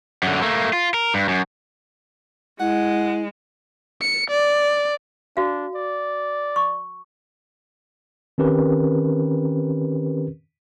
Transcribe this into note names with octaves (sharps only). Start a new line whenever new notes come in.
F#2 D3
A3 A#3
F4
A#4
G2
F#2
G#3 E4 F#5
C#7
D5
D4 F#4 F5
D5
C#6
D#3 C4 C#4 G4 A#4 B4